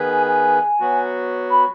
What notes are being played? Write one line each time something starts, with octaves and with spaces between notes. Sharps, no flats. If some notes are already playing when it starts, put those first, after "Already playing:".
Already playing: D#3 B3 G#4 B4
G#5
G#5
F#3 B3 F#4
B5